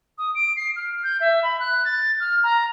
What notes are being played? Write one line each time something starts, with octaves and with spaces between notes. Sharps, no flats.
D#6
D7
C7
F6
G6
E5
B5
F#6
A6
F6
A#5